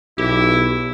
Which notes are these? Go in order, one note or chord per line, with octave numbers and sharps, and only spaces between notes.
B1 E4 G4